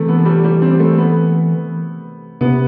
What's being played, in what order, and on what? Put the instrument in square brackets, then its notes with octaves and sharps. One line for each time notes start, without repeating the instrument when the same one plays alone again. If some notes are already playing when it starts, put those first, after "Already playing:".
Already playing: [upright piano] C3 A3 [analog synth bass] E3
[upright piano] B3
A3
G3
G3
C4
A3
B3
[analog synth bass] C3 [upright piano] B3